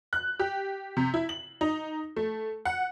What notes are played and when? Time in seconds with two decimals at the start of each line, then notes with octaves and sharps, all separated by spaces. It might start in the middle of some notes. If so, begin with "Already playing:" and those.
0.13 F#6
0.39 G4
0.97 C3
1.14 E4
1.29 F#7
1.61 D#4
2.16 A3
2.65 F#5